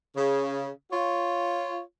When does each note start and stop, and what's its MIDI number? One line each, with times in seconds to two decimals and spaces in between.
0.16 0.68 49
0.91 1.80 65
0.91 1.80 73